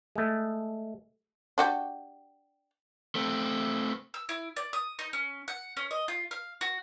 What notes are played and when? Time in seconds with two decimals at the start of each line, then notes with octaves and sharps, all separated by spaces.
0.16 G#3 A3
1.58 D4 F#4 G4
3.15 A3 C4
4.14 E6
4.29 E4
4.56 D5
4.73 D#6
4.99 D#4
5.13 C#4
5.48 F#5
5.77 C#4
5.91 D#5
6.08 F4
6.31 F5
6.61 F#4